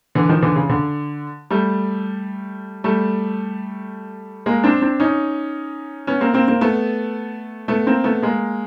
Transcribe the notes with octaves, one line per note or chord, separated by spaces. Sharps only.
D3 E3
D#3 F3
D3 E3
C#3
D3
G3 A3
G3 A3
G#3 A#3
C4 D4
C4 D4
C#4 D#4
B3 C#4
A#3 C4
A#3 C4
A#3 C4
A3 B3
A3 B3
A#3 C4
A3 B3
G#3 A#3